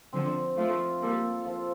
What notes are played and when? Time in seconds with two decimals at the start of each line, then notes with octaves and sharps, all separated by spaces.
0.13 D3 F3 C4
0.57 F3 A3 F4
1.01 G3 A#3 A4
1.46 F3